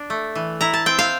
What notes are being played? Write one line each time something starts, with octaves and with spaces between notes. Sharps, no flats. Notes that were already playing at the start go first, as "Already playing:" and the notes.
Already playing: D4
A3
E3
E4 A#5
A5
C4 G5
F5